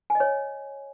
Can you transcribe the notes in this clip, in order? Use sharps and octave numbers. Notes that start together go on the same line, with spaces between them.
G#5
D#5
C#5